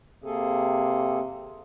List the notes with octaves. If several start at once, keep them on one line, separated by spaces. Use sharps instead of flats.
C3 A#3 G#4 A4